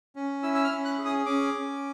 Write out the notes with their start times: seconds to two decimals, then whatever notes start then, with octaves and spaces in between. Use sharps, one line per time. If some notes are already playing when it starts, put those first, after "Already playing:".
0.16 C#4
0.43 E4 E6
0.55 E6
0.64 F6
0.71 C#4
0.85 F#6
0.98 G#4
1.05 D#6
1.26 C#4 D6
1.54 C#4